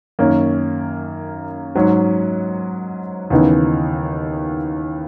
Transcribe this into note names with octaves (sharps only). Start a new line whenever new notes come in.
F#2 D#3 A#3 C#4
G#2 F#3 C#4
D#2 C#3 E3 B3 D#4